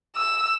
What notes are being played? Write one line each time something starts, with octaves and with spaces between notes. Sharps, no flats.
E6